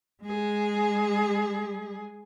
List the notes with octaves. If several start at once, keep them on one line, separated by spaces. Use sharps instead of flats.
G#3 G#4